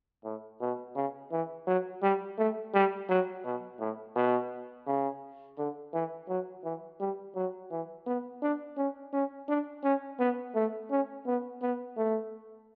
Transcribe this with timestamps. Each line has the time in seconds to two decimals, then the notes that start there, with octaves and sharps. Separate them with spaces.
0.24 A2
0.61 B2
0.96 C#3
1.31 E3
1.67 F#3
2.02 G3
2.38 A3
2.74 G3
3.09 F#3
3.45 B2
3.80 A2
4.16 B2
4.87 C#3
5.58 D3
5.93 E3
6.29 F#3
6.64 E3
7.00 G3
7.35 F#3
7.71 E3
8.06 B3
8.42 D4
8.77 C#4
9.13 C#4
9.49 D4
9.84 C#4
10.19 B3
10.55 A3
10.90 C#4
11.27 B3
11.62 B3
11.97 A3